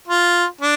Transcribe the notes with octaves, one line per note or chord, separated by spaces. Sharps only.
F4
D4